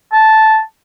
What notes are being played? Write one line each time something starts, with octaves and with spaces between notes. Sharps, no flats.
A5